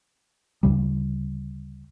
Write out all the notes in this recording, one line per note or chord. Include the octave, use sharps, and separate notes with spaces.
D2 C#3 G3